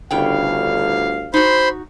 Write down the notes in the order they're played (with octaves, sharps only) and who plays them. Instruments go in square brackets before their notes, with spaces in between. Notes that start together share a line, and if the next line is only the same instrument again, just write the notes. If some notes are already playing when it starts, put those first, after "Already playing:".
[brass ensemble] G1 D2 F5 [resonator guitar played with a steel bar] A2 C#3 G5
[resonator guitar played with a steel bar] D#4 F#4 [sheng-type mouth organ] C5 B5 C6